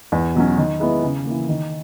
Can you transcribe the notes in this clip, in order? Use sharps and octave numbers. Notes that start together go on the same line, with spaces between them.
E2
B2 F#3 C#4
D#3
G#3 B3 E4
C#3
A#3
E3
D#3